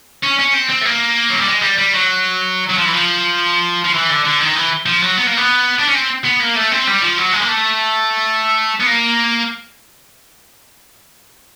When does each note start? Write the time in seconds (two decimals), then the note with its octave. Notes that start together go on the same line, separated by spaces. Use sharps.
0.24 C#4
0.39 C#4
0.54 C4
0.70 C4
0.81 A3
0.85 A#3
1.30 F#3
1.39 G3
1.47 G#3
1.62 G3
1.78 G3
1.94 F#3
2.70 F#3
2.78 F3
2.86 E3
2.93 F3
3.84 F3
3.94 E3
4.10 D3
4.25 D3
4.41 D#3
4.56 E3
4.86 F3
5.02 F#3
5.17 B3
5.27 A#3
5.37 B3
5.79 D4
5.87 C#4
5.95 C4
6.25 B3
6.40 A#3
6.56 A3
6.72 C4
6.87 G3
7.02 F3
7.18 F#3
7.33 G#3
7.41 A#3
7.48 A3
8.81 B3
8.87 A#3